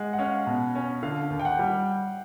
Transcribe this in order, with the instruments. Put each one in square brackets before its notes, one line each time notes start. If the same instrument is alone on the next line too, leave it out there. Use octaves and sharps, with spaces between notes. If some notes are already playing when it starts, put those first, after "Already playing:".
Already playing: [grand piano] G#3 [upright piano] F#5
[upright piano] F#5
[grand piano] C#4 [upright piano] F5
[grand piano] B2
C#4
[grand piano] D3 [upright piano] F5
[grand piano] D#2
[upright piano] G5
F#5
[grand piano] G3